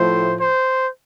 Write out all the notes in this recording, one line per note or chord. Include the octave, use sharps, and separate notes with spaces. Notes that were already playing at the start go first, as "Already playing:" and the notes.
Already playing: A2 F3 A3 C5
C5